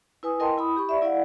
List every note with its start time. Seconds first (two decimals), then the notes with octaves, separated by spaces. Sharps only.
0.23 E4 B4 G#5 D#6
0.40 E4 A#4 D#5 G5 A5 C6
0.58 E4 B5 D#6
0.77 G4 B5 C#6
0.89 D5 E5
1.02 E4 D5 F5 F#5